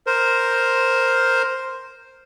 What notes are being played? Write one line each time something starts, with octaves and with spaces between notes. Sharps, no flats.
A#4 C5